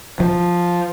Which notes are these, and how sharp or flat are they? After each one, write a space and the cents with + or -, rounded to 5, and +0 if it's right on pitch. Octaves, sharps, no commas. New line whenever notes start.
F3 +5